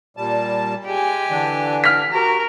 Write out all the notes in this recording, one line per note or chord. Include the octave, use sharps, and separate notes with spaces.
A#2 G3 A5
G#3 G4 G#5
D3 E3 D4
F6 B6
F#4 G4 A#4